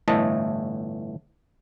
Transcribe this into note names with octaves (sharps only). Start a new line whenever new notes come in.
G1 A2 E3 A3 D#5 A5